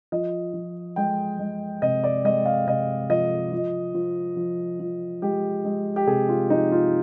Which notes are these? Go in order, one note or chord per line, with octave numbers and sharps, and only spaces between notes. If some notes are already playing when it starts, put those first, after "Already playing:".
F3 D#5
F3
G#3 G5
G#3
C3 D#5
D5
G#3 D#5
F5
C3 D#5
F3 D#5
F3
F3
F3
F3
G#3 G4
G#3
G4
C3 G#4
F4
F3 D#4
F4